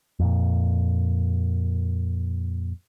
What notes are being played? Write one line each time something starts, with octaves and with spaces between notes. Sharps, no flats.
F2 A#2